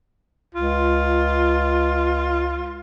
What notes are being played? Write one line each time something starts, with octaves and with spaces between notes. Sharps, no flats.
C#2 F4